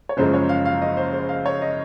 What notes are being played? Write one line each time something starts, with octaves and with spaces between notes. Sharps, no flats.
C#5
F#1 F#2 C#3 F3 G#3 C5
C#5
F5
F5
D#5
C5
C5
F5
C#5
D#5